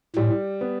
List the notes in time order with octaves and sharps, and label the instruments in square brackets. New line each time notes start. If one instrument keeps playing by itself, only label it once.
[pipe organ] A2 [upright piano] G3
[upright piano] B3